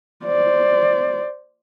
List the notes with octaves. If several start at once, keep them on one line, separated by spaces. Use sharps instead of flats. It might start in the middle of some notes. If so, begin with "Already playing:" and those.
C5 D5